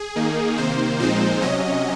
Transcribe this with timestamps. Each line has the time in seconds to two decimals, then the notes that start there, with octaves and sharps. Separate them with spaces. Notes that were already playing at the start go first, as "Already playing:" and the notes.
Already playing: G#4
0.16 D#3 A#3 D#4
0.58 C3 D#3 A#3 C5
0.99 A#2 F3 G#3 C4 D#4 C5
1.41 C3 F#3 C#4 D#5